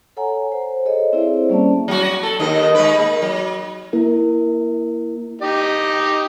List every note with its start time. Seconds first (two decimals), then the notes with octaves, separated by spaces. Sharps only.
0.17 A4 C#5 F#5 G#5 A#5
0.52 C5
0.85 G#4 A4 C#5 D#5
1.13 C4 E4 G#4 C5 D5 E5
1.49 G3 A#3 C#4 D5 A5
1.88 F#3 F#4
2.23 A4
2.40 D#2 D#3 D#5
2.75 G#3 B4
2.99 A#3
3.22 F#3
3.93 A#3 E4 A#4
5.42 D#4 G4 D#5